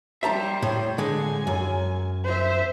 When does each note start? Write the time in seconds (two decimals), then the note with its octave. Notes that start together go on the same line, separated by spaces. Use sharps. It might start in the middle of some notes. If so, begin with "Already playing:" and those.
0.23 G3 C5 E5 A5 A#5
0.62 A2
0.98 D3 G#3 G#5
1.47 F#2
2.24 C5 E5